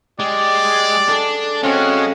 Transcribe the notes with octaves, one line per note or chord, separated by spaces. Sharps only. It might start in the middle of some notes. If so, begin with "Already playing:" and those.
G#3 G4 D5
D4 G#4 A4
C#3 G#3 C4 C#4 F#4 G5